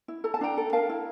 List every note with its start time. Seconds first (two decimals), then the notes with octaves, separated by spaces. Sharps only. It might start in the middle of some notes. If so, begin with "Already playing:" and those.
0.08 E4
0.24 A4 A#5
0.34 A5
0.41 D4 G5 A#5
0.57 A4
0.73 A#4 F5 A5
0.89 E4